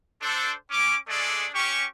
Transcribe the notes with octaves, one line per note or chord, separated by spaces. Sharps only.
D4 A4 C5
C#4 D6
G#3 A3 D4 G#4 A4 D5
C#4 G4 C#6